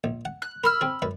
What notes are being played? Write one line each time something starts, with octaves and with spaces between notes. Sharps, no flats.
A#1
F#5
F#6
A#4 B5 E6 F6
C4 G#4
F#2 B4